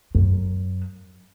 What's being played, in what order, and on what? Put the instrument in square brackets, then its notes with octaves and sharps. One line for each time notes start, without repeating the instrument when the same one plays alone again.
[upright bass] F#2